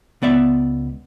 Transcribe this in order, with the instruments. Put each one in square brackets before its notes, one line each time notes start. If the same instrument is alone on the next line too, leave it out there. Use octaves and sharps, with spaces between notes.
[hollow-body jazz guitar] C#2 B3 D5 E5